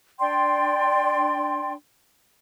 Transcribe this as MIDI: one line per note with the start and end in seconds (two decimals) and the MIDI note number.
0.20 1.74 62
0.20 1.74 74
0.20 1.74 79
0.20 1.74 84